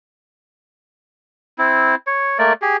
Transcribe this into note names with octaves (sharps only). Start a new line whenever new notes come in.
C4 E4
C#5
A3 A#3 D5
G4 G#4